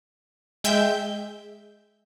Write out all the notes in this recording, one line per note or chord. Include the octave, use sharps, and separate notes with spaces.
G#3 E5 G5 G6